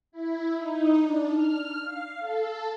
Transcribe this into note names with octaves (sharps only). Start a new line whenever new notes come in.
E4
D#4
D4
F6
F5
A4